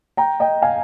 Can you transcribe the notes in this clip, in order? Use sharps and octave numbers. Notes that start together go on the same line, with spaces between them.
G5 A#5
D#5 G5
F5 G#5